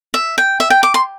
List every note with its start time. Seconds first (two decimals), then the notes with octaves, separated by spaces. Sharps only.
0.14 E5
0.38 G5
0.60 E5
0.70 G5
0.83 D6
0.94 C6